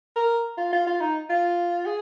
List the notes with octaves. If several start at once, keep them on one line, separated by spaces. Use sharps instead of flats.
A#4
F4
F4
F4
D#4
F4
G#4